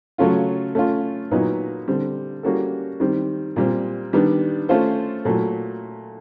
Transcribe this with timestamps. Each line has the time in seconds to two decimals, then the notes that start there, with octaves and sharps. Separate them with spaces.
0.18 C#3 F#3 A3 C#4 F4
0.75 A3 C#4 F4
1.31 A#2 F#3 B3 D#4
1.88 D3 G3 C4
2.43 G3 A#3 C#4 F#4 A4
3.00 D#3 G3 C4
3.56 A#2 G3 C4
4.13 D#3 G3 B3 D4
4.69 A3 C#4 F4 A4 C5
5.25 A#2 F#3 A3